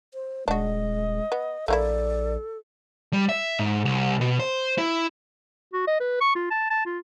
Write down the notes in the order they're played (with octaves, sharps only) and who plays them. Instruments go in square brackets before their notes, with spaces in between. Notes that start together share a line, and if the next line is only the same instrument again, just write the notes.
[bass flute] C5
[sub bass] D#1 [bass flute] G#3 [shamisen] D4 F#4 [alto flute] D#5
[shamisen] B3
[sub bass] A#1 [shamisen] A3 A#3 E4 [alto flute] A4 [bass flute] D5
[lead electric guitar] G3
E5
G#2
C2
B2
C5
E4
[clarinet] F#4
D#5
B4
C#6
F4
A5
A5
F4